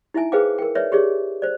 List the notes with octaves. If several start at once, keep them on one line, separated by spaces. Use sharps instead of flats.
D#4 E4 E5 G#5 A5
G#4 B4 C5 F5 G5 D6
A#4 G5
B4 C#5 D5 E5
G4 G#4 C#5 D5
C5 D5